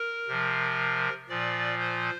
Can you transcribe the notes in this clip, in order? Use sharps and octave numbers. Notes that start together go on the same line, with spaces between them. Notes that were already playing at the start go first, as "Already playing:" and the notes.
Already playing: A#4
C3 F3
A#2 F3 D5
C5